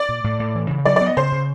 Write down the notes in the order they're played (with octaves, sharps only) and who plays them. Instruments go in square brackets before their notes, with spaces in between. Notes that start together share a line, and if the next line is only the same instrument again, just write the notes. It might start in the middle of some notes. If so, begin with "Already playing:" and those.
Already playing: [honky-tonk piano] D5
[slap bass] A#2
A2
A2
E3
C#3
[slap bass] F#3 [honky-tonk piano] D5
[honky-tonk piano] D5
[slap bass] B3
[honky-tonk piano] D#5
[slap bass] C#3 [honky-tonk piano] C5
[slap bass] C#3